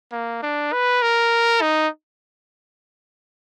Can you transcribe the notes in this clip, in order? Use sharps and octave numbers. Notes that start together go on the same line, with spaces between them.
A#3
D4
B4
A#4
D#4